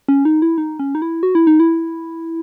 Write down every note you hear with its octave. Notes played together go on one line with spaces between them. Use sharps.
C#4
D#4
E4
D#4
C#4
D#4
E4
F#4
E4
D#4
E4